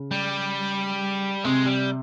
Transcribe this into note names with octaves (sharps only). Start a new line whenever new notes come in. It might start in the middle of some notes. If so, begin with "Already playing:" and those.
Already playing: C#3
G3
C3 G#3
G3